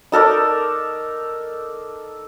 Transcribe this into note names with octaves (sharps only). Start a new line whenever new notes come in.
D#4 A4 A#4 D5